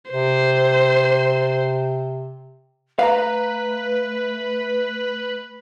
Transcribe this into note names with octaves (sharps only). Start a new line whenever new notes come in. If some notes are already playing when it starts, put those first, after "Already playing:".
C3 C5
A3 B4 F5 A#5